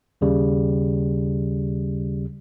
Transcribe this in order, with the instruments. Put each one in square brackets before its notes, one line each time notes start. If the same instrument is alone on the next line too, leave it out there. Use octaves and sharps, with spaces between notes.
[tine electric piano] D#2 C#3 G3